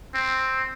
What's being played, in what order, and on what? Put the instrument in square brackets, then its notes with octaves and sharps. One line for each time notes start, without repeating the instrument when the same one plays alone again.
[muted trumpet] C4